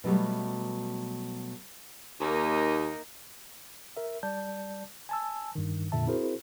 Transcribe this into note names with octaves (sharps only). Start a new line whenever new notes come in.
B2 F#3 G3 A3
D#2 A#3 D#4
A#4 E5
G3 D5 A5 G6
G#5 A5 E6
G2 D#3
F2 A#2 D3 E5 A5
C4 E4 F#4 G#4 A#4 C5